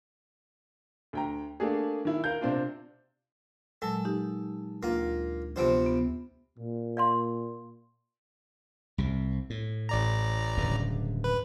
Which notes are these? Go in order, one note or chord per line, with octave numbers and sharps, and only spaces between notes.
D2 G5 A#5
A3 A#3 D4 G4 G#4
D#3 E4
A#4 F5 G6
C3 C4 D4 F4
A#2 F#3 G#3 A4
D#4 G4
D2 A#3 F4
D2 C3 F3 B3 C5
B3
A#2
D5 F5 C6
C2 C3
A2
A1 D5 A#5
D1 G2 C#3
B4